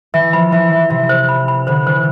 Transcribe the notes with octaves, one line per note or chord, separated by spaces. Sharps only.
E3 E5
F3 B5
E3 E5
E5
C3 E5
C5
B5
B5
D3 C5
E3 C5